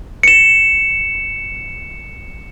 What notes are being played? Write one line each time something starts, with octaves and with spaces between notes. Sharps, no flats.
C#7 E7